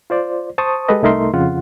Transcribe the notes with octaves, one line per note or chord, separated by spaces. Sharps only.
F4 C5 D5
C5 A5 C#6 D#6
G#3 G4 A4 B4 D#5
C2 A3 D#4 A#4 E5 C6
F2 C#3 F4 F#5